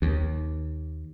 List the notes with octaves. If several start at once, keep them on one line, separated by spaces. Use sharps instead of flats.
D#2